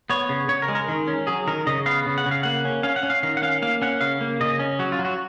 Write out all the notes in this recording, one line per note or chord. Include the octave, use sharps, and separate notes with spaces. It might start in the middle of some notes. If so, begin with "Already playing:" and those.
B3 C#5
C#3
C#3 C#5
A#4
G#3
A#4
D#3
C#4
F#3 G#4
D#3 A#4
C#3 D#5
B3 F5
C#3
F#5
C#3
F5
A#3 F#5
C#4
C#4 F5
F#5
C#4
F5
D#3 F5
F#5
C#4 F5
A#3 F5
C#4 F#5
C#3 F5
A#3
C#3 D#5
C#4
F#3 F#4
F4
F#3
F#4